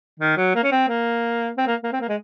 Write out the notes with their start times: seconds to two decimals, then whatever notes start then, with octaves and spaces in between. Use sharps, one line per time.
0.20 D#3
0.37 F#3
0.55 A#3
0.64 C#4
0.72 C4
0.89 A#3
1.57 C4
1.67 A#3
1.84 A#3
1.93 C4
2.01 A#3
2.08 G#3